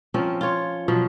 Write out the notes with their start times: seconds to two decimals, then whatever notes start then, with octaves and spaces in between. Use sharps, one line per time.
0.14 F3 C4 C#4 A#4
0.41 F4 C#5
0.88 B2 F3 F#3